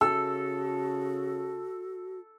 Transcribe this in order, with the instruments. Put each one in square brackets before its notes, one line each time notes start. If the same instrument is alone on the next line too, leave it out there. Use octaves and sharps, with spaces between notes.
[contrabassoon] C#3 [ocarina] F#4 [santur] A4 [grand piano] E6